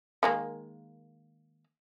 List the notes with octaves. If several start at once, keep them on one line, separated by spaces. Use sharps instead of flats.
D#3 G#3 A#3